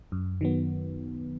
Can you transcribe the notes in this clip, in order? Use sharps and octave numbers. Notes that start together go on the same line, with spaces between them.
F#2
D#3 F#3 B3